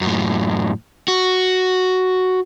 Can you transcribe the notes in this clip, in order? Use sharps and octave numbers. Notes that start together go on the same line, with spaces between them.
F#2 A2
F#4